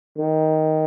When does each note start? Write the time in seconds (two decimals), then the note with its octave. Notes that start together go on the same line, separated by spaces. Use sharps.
0.18 D#3